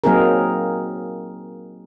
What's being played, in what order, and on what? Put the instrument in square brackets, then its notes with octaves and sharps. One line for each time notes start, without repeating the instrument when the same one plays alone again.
[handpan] F#3 A#3 C4 D#4 G#4 A#4